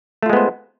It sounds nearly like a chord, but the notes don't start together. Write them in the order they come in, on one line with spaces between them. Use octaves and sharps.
A3 F4 G#3 B3 C5